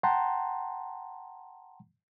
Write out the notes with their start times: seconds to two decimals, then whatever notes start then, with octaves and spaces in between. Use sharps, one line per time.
0.03 F#5 G5 A5 A#5 C6